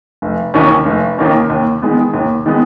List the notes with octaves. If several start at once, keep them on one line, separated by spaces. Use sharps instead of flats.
F1
D#2 D#3 A#3 C#4
F1
D#2 D#3 A#3 C#4
D#2
D#3 G#3 B3
D#2
D#3 G#3 B3